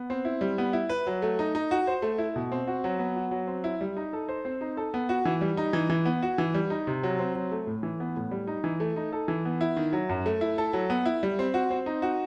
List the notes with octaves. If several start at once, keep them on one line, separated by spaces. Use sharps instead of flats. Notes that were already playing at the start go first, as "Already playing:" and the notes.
Already playing: B3
C4
E4
G3
B3
E4
B4
F#3
A3
D#4
D#4
F#4
C5
A3
E4
B2
C4
F#4
F#3
B3
F#4
F#3
C4
E4
G3
D#4
A4
C5
C4
D#4
A4
B3
F#4
E3
G3
D#4
E3
E3
B3
F#4
E3
G3
D#4
C3
F#3
C4
F#3
A3
A2
E3
B3
A2
G3
D#4
E3
A3
D#4
A4
E3
B3
E4
D#3
F#3
F#2
A3
E4
A4
F#3
B3
E4
G3
C4
F#4
C4
D#4
F#4